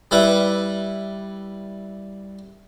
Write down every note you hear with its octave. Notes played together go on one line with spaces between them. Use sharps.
G3 E4 B4